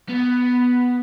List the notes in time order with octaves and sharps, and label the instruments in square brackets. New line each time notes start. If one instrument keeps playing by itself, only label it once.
[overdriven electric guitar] B3